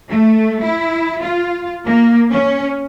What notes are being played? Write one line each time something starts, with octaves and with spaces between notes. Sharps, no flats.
A3
E4
F4
A#3
C#4